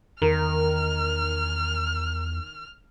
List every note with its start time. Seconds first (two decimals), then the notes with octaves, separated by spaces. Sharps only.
0.22 E2 D#3 A#4 F6